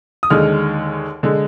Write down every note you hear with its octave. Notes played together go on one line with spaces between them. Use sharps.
D#6
D#2 D3 G#3 F6
D3 G#3